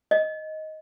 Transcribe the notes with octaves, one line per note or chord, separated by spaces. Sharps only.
D#5